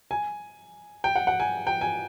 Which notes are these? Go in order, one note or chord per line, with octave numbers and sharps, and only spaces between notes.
G#5
G5
F#5
F#5
G#5
G5
G#5